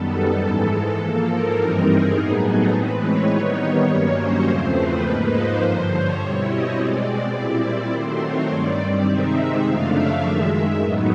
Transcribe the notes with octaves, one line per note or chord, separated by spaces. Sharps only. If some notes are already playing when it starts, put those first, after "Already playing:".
Already playing: F#2 D#3 G3 B3 A4
A4
G#2 E3 G#3
G#2 F3 A#3
A#4
G2 E3 G3 C4 D#4
G#4
A2 F#3 B3 D#4
A4
A2 E3 G#3 C4 B4
C#5
D#3 G3 B3 D#4
C#5
G2 D#3 F#3 A#3 C#4
C5
E2 C#3 F3 A3 C4
B4
G#2 F3 A#3 D#4 B4
C5
G2 D3 F3
C#5
B2 G3 C4 E4
D#5
B2 G#3 C4 D5
A#2 G3 C4 E4 D5
D#3 F#3 A3 C4 C5
C#5
G2 D#3 G3 C4 D5
D5
C3 D#3 G#3 C4 D#4 E5
F#2 C#3 F3 A3 D4 F5
E5
F#2 D#3 G#3
E5
A2 F#3 B3 D#4